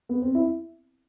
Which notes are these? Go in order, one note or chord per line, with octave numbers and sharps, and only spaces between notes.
B3
C4
E4